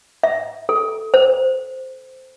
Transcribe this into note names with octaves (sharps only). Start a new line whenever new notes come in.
E5
A4
C5